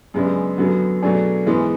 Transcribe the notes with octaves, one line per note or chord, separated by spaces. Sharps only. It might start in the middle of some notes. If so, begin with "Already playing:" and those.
F#2 C#3 G#3 B3 D4
F#2 D3 F#3 B3 F#4
B2 F#3 A3 D4 G#4
G#2 E3 G#3 B3